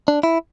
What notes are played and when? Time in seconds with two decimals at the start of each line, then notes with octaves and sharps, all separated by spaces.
0.08 D4
0.23 E4